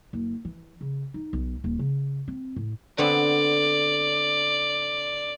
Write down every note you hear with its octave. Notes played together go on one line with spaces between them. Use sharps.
F#1
E3
C#3
D#4
B1
D#1
C#3
C4
A2
D3 B3 C4 D5